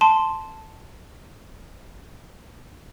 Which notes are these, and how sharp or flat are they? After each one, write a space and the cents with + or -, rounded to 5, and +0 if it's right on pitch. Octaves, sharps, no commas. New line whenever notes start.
A5 +0 C6 +0